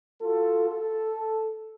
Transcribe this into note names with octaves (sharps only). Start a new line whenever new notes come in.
F4 F#4 A4
A4